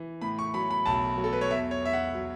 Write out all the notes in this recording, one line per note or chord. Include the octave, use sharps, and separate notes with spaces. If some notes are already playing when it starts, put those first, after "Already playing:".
Already playing: E3
A2 B5
C#6
F#3 B5
B5
B1 A5
F#3
A4
B4
C#5
E2 E5
C#5
E2 E5
F#5
F#3